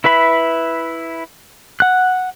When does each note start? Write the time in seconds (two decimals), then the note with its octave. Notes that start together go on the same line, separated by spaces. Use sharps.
0.04 E4 B4 E5 B5
1.80 F#5 F#6